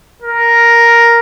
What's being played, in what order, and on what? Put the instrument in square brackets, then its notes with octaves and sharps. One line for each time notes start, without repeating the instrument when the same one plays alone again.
[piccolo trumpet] A#4